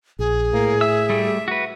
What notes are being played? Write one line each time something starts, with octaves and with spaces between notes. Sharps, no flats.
A#1 G#4
A2 A#3
E5 E6
G3 A3
F#4 B4